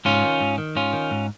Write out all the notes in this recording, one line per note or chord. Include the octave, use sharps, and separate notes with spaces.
G#2 C#4 F4
D#3
G#2
D#3
G#2 C#4 F4
D#3
G#2